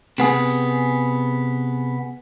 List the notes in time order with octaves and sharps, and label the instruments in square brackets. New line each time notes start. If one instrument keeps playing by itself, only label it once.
[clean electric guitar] C3 B3 G#4